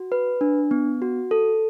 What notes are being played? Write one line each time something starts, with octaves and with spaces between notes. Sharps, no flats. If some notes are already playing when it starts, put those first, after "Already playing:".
Already playing: F#4
B4
D4
B3
F#4
A4